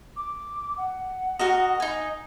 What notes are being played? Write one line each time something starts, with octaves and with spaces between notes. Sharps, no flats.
D6
F#5
F#4 A#4 D#5
D#4 G#5